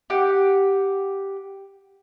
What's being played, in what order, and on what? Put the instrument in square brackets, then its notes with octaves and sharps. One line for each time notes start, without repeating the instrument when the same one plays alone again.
[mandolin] G4 F#5